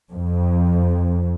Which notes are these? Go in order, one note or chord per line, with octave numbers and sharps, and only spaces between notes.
F2